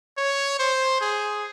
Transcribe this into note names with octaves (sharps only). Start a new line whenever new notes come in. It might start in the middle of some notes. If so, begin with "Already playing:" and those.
C#5
C5
G#4